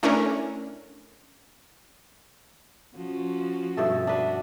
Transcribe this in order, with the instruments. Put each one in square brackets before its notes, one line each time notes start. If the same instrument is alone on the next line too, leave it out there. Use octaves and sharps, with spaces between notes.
[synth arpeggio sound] A3 C#4 D4 E4 A#4
[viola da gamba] F3 C#4 F#4
[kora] G2 B2 A4 [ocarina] E5
[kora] D4 B4 [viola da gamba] F#4